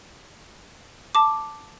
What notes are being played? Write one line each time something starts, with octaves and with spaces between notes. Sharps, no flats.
A5 D6